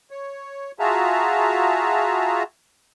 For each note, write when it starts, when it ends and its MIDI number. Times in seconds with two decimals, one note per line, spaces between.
0.11 0.72 73
0.79 2.43 65
0.79 2.43 66
0.79 2.43 68
0.79 2.43 76
0.79 2.43 81
0.79 2.43 82